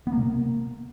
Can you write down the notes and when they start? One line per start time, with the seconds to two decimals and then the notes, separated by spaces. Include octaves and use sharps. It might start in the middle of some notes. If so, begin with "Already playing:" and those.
0.07 B3
0.12 A#3
0.17 C3
0.23 A#3